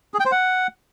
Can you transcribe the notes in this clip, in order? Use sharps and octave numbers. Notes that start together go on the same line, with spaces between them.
G#4
G5
C5
F#5